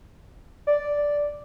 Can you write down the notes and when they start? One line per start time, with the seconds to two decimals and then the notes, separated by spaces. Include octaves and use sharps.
0.67 D5